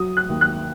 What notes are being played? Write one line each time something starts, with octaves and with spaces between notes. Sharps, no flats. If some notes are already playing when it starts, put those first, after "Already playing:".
Already playing: F#3 D#6
F#6
D#2
F#6